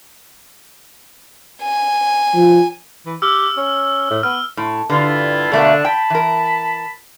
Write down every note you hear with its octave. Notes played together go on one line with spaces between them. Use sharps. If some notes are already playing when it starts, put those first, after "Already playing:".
G#5
F3
E3
G4 E6 F6 G7
C#4
A2
B3 F6
A2
G2 D3 E4 F4
B2 D3 A3 A#3 D4
G5 A5 B5
E3 A#4